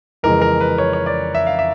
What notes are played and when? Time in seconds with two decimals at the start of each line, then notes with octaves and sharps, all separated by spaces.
0.23 F2 C#3 E3 G#3 A#4
0.41 A#4
0.61 B4
0.78 C#5
0.93 C#5
1.06 D5
1.35 E5
1.46 F5
1.59 E5